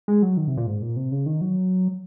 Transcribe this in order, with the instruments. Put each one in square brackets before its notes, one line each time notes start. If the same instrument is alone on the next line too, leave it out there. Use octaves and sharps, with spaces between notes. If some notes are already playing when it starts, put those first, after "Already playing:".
[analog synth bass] G#3
F#3
D#3
C3
A#2
G#2
A#2
C3
C#3
D#3
F#3